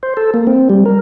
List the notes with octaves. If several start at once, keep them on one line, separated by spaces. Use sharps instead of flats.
C5
A4
A#3
C4
G3
A#4